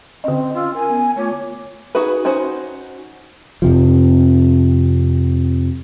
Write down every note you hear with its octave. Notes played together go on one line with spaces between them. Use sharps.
D3 C4 C#4 D#5
C#4 F4 E6
A#4 G#5
B3
A3 F4 C#5 D6
D#4 F#4 G#4 B4
C#4 D#4 F#4 C5
F2 C3 F3